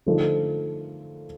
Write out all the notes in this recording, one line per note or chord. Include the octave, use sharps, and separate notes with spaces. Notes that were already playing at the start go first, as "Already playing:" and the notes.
D3 F3 A3 D#4